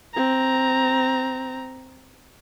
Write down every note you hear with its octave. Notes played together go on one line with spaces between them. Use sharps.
C4 A#5